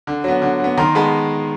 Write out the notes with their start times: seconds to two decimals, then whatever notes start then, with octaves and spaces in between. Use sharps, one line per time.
0.07 D3
0.24 F#3 B3
0.42 D3
0.60 F#3 B3
0.77 D#3 A#5 C6
0.95 G#3 B3 A5 B5